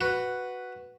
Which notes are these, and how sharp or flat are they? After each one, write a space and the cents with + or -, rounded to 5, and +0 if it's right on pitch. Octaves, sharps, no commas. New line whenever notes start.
F#4 +0 B4 +0